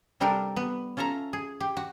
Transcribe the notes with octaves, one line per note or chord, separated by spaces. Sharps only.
C3 G3 D4 G4 A4 A#4
B3 B4
C#4 F4 A4 E5 A#5
G#4
G4
F#4